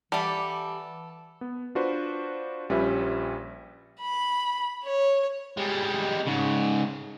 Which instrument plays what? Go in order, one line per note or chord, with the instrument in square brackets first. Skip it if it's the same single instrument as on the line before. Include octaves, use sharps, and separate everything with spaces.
[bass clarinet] E3 [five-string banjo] G3 [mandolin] A4 D6 [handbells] E5 F#5 A5
[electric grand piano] B3
D4 F4 F#4 B4 C5
A#1 G3 C#4 F4 B4 E5
[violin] B5
C#5
[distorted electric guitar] G3 G#3
G#2 C#3